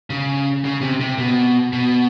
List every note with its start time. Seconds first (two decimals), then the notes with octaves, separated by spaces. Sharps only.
0.10 C#3
0.65 C#3
0.82 C3
1.00 C3
1.18 B2
1.73 B2